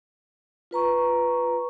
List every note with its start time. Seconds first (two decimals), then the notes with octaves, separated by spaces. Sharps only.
0.71 F4 B4 A#5 C#6